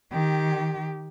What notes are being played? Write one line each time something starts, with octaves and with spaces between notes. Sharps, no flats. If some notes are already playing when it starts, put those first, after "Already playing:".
D#3 G4